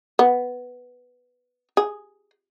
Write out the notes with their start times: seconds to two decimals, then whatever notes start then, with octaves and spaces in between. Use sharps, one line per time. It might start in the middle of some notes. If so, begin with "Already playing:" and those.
0.19 B3
1.77 G#4